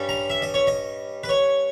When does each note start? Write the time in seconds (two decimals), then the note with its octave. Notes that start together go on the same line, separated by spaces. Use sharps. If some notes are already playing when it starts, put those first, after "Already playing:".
Already playing: G2 G3 C#4
0.09 A#5
0.30 E5
0.42 D#5
0.54 C#5
0.67 D#5
1.24 B4
1.29 C#5